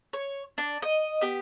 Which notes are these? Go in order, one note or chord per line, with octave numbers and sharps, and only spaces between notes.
C#5
D4
D#5
B3 G4